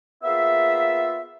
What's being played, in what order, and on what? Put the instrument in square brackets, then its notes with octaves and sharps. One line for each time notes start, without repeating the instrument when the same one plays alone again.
[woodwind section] A#3 B3 F4 G#4 E5